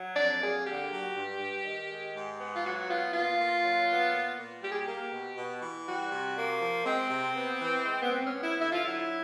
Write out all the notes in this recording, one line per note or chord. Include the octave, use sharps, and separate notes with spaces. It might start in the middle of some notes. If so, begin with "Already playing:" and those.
Already playing: F#3
F2 D5
A#3 G#4
D3 G4
F#3
G2
G2
D#3
G#3
G#2
B3
F4
F#3 F#4
B3 F4
A#2 F4
A#2
F#3
B3
A#2
A#2
G3 G4
G#4
G4
A#3
B2
B2
E3
G3 F#4
C3
A#3
F3
G#3 C4
C3
B3
E3
G#3
B3
G#2 C4
C#4
B3
E4
D3 E4
F4
F#3 E4